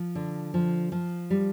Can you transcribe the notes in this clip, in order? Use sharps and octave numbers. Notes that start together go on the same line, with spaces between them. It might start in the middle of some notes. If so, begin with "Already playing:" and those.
Already playing: F3
D3
F3
F3
G3